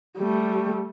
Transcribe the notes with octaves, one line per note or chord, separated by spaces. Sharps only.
G3 A3